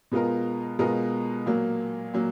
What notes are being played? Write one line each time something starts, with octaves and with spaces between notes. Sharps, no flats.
B2 G#3 B3 F4 A#4
B2 G#3 B3 F4 A#4
A#2 F#3 A#3
A#2 F#3 A#3